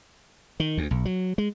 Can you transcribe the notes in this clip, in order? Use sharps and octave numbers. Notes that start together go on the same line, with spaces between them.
D#3
D2
B1
F#3
G#3